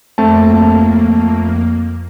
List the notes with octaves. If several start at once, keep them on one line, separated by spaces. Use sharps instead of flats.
F2 A3 A#3 C4 A5